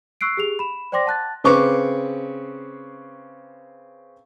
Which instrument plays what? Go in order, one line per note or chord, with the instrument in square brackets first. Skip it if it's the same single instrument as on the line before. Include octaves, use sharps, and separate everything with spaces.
[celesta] C#6 E6 F#6 C7 D7
G4 G#4 F7
B5 E7
C5 D5 G5 C6 D6 A#6
F#5 A5 F#6 A6
[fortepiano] C#3 C4 B4 C#6 D6